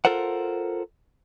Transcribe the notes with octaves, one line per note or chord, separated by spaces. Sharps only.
F4 A4 A#4 C5 F#5